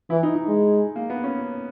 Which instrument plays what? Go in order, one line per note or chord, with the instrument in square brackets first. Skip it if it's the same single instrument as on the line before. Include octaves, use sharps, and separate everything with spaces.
[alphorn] E3 [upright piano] E4
[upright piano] D#4
D#4
[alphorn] G#3
[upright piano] A#3
B3
C#4